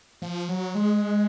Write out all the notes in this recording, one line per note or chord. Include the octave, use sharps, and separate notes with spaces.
F3
F#3
G#3